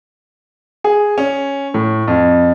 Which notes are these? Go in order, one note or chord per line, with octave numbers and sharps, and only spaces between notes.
G#4
C#4
A2
F2